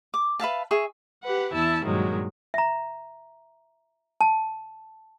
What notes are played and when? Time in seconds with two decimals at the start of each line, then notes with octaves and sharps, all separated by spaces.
0.14 D6
0.40 B4 E5 F5 A5
0.71 G#4 E5 C#6
1.24 G4 B4 F#5
1.52 E2 E4 A5 E6
1.86 G2 A#2 D#3 F#3 G#3
2.54 E5 A#5
4.21 A5